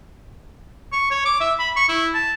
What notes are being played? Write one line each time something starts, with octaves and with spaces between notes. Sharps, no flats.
C#6
C#5
D6
E5
B5
C#6
E4
A5